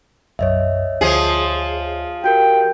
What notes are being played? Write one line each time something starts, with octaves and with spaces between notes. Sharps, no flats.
B1 F#2 C#5 D#5 E5
D2 F3 G#4
F#4 G4 A#4 G5